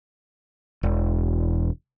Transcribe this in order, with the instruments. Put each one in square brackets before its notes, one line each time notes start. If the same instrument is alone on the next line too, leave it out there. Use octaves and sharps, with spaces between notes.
[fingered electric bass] E1